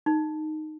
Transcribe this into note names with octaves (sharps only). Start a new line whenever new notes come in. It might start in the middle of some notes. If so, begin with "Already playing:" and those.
D#4